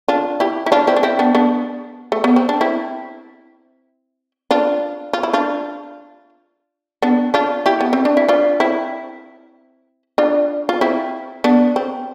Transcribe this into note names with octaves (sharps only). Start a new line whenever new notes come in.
D4 F4
E4 G4
E4
D4 F4
C4 E4
D4
C4 E4
B3 D4
B3 D4
A3
B3
C4
D4
C4 E4
D4 F4
F4
E4
D4 F4
B3 D4
D4 F4
E4 G4
B3
C4
D4
E4
D4 F4
C4 E4
D4 F4
F4
C4 E4
B3 D4
C4